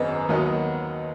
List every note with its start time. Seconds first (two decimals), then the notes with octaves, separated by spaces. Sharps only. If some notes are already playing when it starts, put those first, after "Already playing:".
Already playing: G#1 F#2 F#3 B3 G#4 B4 D#5
0.29 D#2 D#3 F#3 B3 D#4